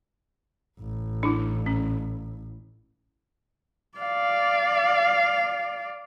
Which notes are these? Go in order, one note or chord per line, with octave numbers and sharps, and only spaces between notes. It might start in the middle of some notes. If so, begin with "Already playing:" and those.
A1
D4 E4
C#4
D5 F5